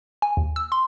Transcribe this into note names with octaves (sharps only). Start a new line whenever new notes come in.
G#5
D#2
E6
C6